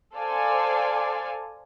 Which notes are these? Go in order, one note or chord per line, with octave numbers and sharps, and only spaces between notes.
A4 C5 D5 F5 G#5